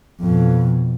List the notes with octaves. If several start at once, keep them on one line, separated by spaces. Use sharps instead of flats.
F2 B2